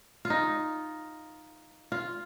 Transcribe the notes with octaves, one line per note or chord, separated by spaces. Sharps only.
F4
D#4
F4